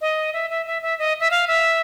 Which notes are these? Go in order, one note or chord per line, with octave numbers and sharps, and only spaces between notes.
D#5
E5
E5
E5
E5
D#5
E5
F5
E5